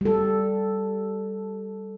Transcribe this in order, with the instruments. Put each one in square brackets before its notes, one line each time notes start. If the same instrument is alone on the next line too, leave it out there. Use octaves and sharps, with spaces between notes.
[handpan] G3 A4